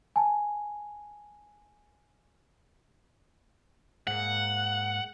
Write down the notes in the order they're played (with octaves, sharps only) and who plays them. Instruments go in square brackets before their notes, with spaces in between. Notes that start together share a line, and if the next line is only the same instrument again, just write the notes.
[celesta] G#5 A5
[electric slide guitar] G#2 A#3 [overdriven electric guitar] F#5